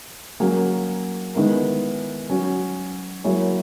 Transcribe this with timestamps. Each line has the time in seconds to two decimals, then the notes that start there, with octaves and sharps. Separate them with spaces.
0.40 F#3 A#3 C#4 G#4
1.35 D#3 G#3 B3 E4 A#4
2.30 F#3 C#4 F#4
3.24 F#3 A#3 E4 G#4 C#5